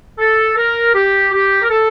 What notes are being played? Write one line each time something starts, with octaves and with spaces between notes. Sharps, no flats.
A4
A#4
G4
G4
A#4
A4